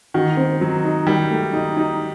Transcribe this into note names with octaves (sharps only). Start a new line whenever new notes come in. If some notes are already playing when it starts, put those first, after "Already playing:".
D#3 F#4
C4
F#3 D#4
D#4
D#3 G3
A3
D#4
D#4